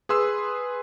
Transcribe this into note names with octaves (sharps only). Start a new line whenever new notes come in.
G#4 B4 C6 E6